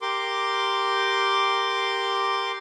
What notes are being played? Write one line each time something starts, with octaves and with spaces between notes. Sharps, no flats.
G4 A#4 C6 D6